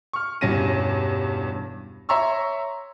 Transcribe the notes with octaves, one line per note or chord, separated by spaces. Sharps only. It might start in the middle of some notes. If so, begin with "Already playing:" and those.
C#6 F6
E1 G2 C#4 A#6 D#7
C#5 E5 A#5 C6 C#6 E6